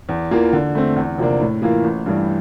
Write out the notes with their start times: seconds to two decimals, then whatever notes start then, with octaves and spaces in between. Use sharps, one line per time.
0.09 E2
0.31 E3 A#3 F4
0.53 D3
0.75 A3 C4
0.96 E2
1.18 C3 F3 A#3 D4
1.40 A2
1.62 E3 A#3 F4
1.84 A1
2.06 G2 E3 G3